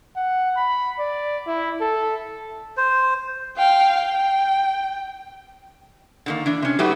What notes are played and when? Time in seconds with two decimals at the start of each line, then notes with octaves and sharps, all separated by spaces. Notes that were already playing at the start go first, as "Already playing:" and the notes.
0.16 F#5
0.57 B5
0.99 D5
1.47 E4
1.81 A4
2.77 C5
3.57 F5 G5
3.99 G5
6.26 D3 D#3 A#3
6.46 E3 D4
6.62 C3 C#4
6.79 F#3 A3 D#4 F#4 G4 B4